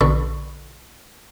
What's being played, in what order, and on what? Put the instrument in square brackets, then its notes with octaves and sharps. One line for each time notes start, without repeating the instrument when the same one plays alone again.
[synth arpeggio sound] A#1 B2 D3 A4 B5 C#6